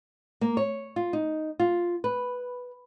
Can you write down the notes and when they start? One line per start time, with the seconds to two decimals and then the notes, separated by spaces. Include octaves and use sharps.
0.41 A#3
0.57 C#5
0.96 F4
1.13 D#4
1.60 F4
2.04 B4